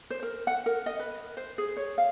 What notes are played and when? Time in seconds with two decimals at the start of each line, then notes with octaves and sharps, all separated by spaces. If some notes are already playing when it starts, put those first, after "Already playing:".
0.10 C5
0.23 A#4
0.47 F#5
0.66 A#4
0.86 D#5
0.99 B4
1.37 C5
1.58 G#4
1.77 C#5
1.98 F5